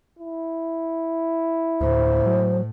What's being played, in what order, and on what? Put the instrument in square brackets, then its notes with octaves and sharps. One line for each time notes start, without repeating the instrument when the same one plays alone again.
[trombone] E4
[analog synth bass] D2 [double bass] A2 [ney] C5
[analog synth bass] F#3